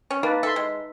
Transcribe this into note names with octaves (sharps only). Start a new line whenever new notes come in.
C#4
A#3 D#4 B4 A5
A4 E5 C6
G#3